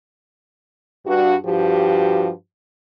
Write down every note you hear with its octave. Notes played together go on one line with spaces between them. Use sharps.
G2 F#4
G2 F3 F#4 G4